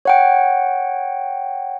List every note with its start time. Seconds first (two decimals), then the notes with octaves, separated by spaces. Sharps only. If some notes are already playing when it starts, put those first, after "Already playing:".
0.05 C#5 F#5 G5